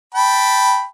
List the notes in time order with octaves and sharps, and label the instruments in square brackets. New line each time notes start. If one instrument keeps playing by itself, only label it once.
[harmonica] G5 A5 B5